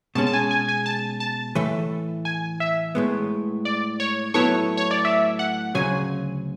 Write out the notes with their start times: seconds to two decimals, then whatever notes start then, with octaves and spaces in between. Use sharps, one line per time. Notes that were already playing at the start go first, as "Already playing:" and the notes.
0.15 B2 G#3 C#4 G#4 A5
0.27 A5
0.33 G#5
0.51 G#5
0.68 G#5
0.86 A5
1.20 A5
1.55 A2 E3 A3
2.25 G#5
2.60 E5
2.95 A2 G#3 B3
3.65 D5
4.00 C#5
4.34 A2 F#3 B3 E4 A4 C#5
4.77 C#5
4.91 D5
5.05 E5
5.39 F#5
5.75 D2 C#3 F#3 G#5